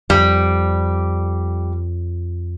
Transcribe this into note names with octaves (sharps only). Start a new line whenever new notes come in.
F2 G3